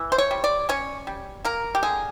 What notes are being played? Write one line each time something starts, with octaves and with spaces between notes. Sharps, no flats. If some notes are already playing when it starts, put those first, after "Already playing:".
Already playing: E3
C5
C#5
G3
D5
C#4 C#5
G3
A#3 A#4
G4
D3 G#4